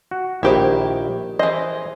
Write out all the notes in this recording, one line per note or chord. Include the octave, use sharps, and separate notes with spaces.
F#4
A#1 D#3 D#4 E4 G4 C5
E3 G#4 C5 D#5